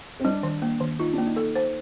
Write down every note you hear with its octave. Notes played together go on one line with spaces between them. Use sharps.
C4
G3 D4
D#3
A#3
D#3
D#4 F4
A#3 D4
D#4
A4
C5